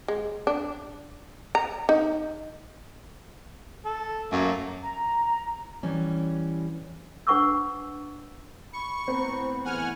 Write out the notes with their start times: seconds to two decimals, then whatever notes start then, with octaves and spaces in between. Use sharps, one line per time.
0.08 G#3
0.47 D4
1.55 A#5
1.89 D#4
3.86 A4
4.32 F#2 A3 A#3
4.82 A#5
5.83 E3 G3 C#4
7.27 D4 B4 F#5 C#6 D6 E6
8.73 B5 C#6
9.08 A2 B3 C4 C5 A#5
9.65 E2 A3 C#4 F#5 G#5 F6